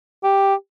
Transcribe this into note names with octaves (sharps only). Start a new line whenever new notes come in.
G4